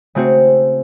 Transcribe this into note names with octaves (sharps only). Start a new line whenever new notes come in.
C#3 A3 C4 F#4